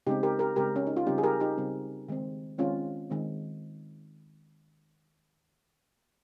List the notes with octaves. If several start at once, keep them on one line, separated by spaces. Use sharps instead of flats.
C#3 G#3 C4 D#4 G4
G4 A#4
G4 A#4
C#3 G#3 C4 G4 A#4
C#4
D#4
F4
C#3 G3 C4 D#4 G4
G#4
G4 A#4
D#4 G4
C#3 G3 C4
D#3 G#3 C4
D#3 G#3 C4 C#4 F4
D#3 G#3 C4